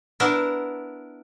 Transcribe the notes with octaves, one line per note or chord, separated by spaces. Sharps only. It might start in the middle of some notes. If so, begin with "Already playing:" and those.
B3 D4 E4 A#4